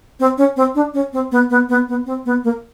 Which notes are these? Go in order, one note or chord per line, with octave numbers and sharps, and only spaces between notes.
C4
C#4
C4
D4
C#4
C4
B3
B3
B3
B3
C4
B3
A#3